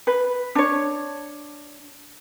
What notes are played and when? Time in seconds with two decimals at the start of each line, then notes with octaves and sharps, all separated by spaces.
0.07 B4
0.55 D4 C#5